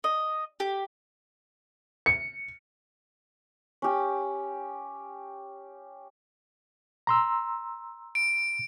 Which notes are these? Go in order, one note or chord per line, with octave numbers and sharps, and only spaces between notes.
D#5
G4
C#7
C#4 G4
A#5 C6 E6
D7